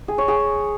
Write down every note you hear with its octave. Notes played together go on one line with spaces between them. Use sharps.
G#4
C#5
G#4